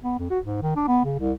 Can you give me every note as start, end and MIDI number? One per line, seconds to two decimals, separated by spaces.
0.04 0.15 59
0.19 0.30 41
0.30 0.39 66
0.44 0.62 44
0.62 0.74 51
0.76 0.85 62
0.88 1.01 59
1.05 1.19 49
1.19 1.32 36